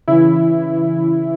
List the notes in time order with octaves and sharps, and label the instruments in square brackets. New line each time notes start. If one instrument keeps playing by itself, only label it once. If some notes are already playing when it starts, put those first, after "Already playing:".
[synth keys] C#3 E3 E4